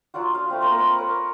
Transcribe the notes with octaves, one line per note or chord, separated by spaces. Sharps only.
F#3 D4 F4 F#4
F5
A3 C4 B5
A#3 A#4 C5
B4 B5 C#6
A#4 B4 C#5